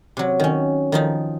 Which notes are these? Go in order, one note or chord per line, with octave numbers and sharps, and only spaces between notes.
C3 F#3
D#3 C#4
D#3 F3 D#4